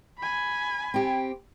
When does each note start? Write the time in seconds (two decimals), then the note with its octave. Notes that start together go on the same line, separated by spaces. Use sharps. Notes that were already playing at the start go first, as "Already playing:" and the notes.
0.18 G#5 B5
0.94 C4 G4